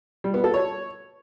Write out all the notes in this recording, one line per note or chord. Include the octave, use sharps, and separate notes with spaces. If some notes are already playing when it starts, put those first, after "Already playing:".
G3
B3
A4
C#5